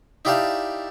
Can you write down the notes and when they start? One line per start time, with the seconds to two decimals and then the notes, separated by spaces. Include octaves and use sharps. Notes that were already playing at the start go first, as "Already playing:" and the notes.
0.25 D#4 E4 G4 D5 F5 A5